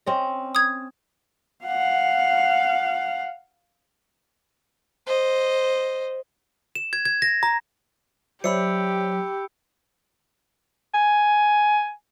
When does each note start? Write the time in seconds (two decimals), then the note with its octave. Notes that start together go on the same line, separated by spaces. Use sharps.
0.06 C4 C#4 D#5
0.55 D#6 G#6
1.65 F5 F#5
5.07 C5 D#5
6.75 E7
6.93 G#6
7.05 G#6
7.22 A#6
7.43 A#5
8.44 F#3 G4 C5 D5 E5 B5 E6 C#7
10.94 G#5